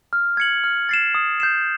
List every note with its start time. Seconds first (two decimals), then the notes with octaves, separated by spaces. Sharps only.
0.13 F6
0.37 G#6 C#7 F#7
0.64 F6
0.89 A6 C7 E7
1.15 D#6
1.40 G6 C7 E7